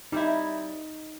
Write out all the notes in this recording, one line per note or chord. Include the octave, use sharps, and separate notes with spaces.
G3 C4 D#4 E4